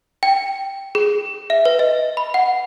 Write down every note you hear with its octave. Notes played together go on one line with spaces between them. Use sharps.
G5
G#4
E5
B4
D#5
B5
F#5